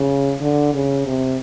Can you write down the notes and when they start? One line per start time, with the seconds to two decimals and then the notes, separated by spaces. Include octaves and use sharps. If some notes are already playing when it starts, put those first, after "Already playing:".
Already playing: C#3
0.41 D3
0.73 C#3
1.06 C3